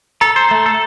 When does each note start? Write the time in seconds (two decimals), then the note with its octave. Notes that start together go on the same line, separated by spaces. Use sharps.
0.21 A4 A#5
0.36 C5
0.51 A3
0.66 A4